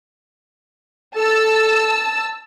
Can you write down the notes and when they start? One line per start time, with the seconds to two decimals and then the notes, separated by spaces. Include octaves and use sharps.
1.16 A4 A5 E6